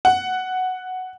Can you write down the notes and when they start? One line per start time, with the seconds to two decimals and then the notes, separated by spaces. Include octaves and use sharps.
0.05 F#5